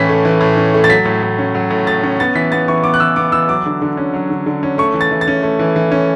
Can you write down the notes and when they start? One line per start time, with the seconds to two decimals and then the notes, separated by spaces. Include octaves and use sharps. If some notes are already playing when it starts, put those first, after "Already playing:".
Already playing: A2 E3 C#4 B6
0.09 A3
0.25 E3
0.41 A2
0.57 C#4
0.74 A3
0.84 A6
0.89 F#3 B6
1.05 A2
1.23 A2
1.39 C#4
1.55 F#3
1.71 A2
1.87 A2 A6
2.03 C#4
2.19 B3 A6
2.35 E3 B6
2.52 B3 A6
2.68 E3 C#6
2.84 B3 D6
2.94 F#6
3.00 E3 E6
3.16 B3 D6
3.32 E3 E6
3.49 F#3 D6
3.66 D3
3.82 D3
3.97 C#4
4.14 F#3
4.30 D3
4.46 D3
4.63 C#4
4.78 A3 C#6
4.94 E3
5.01 A6
5.11 E3
5.21 A6
5.28 C#4
5.43 A3
5.59 E3
5.76 E3
5.92 C#4